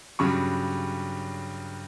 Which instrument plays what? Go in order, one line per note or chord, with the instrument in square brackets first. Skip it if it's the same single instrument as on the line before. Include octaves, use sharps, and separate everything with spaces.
[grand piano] G2 C#3 F#3 B5 C#6